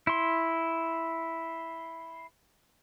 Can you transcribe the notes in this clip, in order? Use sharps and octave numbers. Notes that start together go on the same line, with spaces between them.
E4 C6